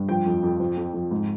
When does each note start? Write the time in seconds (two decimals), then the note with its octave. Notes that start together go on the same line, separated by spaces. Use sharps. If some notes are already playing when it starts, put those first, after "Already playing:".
Already playing: G2
0.09 F3 G5
0.26 F2
0.43 F2
0.60 F3
0.77 F2
0.94 F2
1.11 G#2